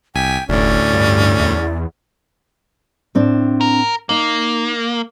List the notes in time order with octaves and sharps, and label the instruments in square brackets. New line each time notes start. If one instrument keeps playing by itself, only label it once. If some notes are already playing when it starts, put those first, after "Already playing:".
[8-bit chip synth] C2 G#5 B6 [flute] G5
[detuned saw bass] F1 [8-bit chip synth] D2 A2 [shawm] C#4 [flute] D5
[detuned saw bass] G2
E2
[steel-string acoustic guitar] A2 C4 D4
[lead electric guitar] A#4
[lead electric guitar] A#3 [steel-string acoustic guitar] D#4 D#5